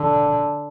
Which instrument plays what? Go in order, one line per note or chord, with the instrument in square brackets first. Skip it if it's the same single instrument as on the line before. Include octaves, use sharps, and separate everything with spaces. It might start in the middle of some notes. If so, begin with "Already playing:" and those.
Already playing: [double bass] D3